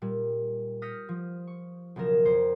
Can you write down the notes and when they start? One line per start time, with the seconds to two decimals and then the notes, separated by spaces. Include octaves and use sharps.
0.02 A#2 G3
0.82 D#6 F6 G6 A#6 B6 C#7
1.09 F3
1.47 C#6
1.96 B1 C#3 F3 A#4 E7
2.25 F2 C5